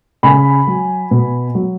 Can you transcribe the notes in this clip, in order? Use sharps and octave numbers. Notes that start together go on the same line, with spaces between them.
C#3 G#5 B5
F#3
B2
F#3